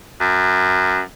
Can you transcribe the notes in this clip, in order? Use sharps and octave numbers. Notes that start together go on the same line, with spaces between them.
F#2